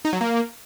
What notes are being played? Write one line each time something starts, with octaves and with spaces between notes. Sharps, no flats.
D#4
F#3
A#3